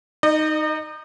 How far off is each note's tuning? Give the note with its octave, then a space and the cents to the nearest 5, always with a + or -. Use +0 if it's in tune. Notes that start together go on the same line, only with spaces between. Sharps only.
D#4 +0 D#5 -40